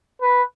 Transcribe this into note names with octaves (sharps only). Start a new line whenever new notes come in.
B4